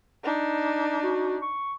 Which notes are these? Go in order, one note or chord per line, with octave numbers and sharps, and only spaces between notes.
D4 D#4
F#4
C#6